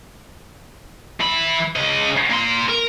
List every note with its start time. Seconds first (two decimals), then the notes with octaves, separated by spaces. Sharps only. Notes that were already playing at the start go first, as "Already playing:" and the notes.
1.20 E3 B5
1.76 C#3 D#5
2.31 A#3 C6
2.69 A#4